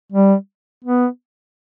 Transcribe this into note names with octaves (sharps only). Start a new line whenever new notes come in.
G3
B3